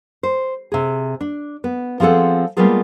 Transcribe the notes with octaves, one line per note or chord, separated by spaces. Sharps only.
C5
C3 G#4
D4
B3
F3 C4 G#4 A4 F#5
G3 G#3 A#3 B3 F4 G#4